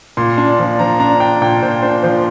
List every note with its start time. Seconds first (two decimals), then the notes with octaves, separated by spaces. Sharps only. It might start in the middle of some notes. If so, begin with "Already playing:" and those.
0.17 A#2 C6
0.38 D4
0.59 F3
0.79 F3 A#5
1.00 D4 A#5
1.20 D4 G5
1.42 A#2 G5
1.62 A#2 C5
1.82 D4 C5
2.03 F3 C5